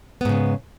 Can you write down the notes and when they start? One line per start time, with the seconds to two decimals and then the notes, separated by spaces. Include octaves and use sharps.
0.21 B3
0.25 G#2
0.29 C#3